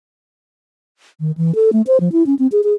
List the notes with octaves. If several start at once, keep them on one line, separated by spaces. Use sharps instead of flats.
D#3
E3
A4
A3
C5
F3
E4
C#4
C4
G#4
G#4